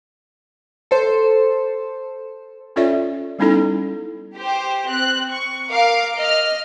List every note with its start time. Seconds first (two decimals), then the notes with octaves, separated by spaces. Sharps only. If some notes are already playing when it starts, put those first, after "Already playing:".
0.91 A4 C5
2.76 C#4 F4 A4 C#5 D5 E5
3.39 G3 B3 C#4 D#4 E4 A4
4.36 G4 C5
4.89 C4 F#6
5.31 C#6
5.70 A#4 F5 D6
6.17 D#5 F6